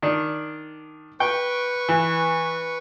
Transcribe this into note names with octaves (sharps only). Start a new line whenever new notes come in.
D#3 D4
B4 G5 C#6
E3